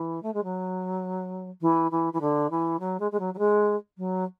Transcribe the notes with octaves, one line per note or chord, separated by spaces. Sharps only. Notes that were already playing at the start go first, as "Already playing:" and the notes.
Already playing: E3
A3
G#3
F#3
E3
E3
E3
D3
E3
F#3
G#3
G#3
F#3
F#3
G#3
F#3